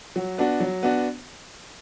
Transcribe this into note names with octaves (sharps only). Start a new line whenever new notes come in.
F#3
B3 D4 F#4
F#3
B3 D4 F#4